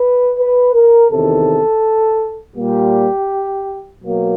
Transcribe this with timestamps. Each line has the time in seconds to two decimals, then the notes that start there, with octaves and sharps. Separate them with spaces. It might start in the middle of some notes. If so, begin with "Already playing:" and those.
Already playing: B4
0.38 B4
0.74 A#4
1.11 E2 C3 D#3 A4
2.56 A#2 G3 A#3 G4
4.01 B2 F#3 A#3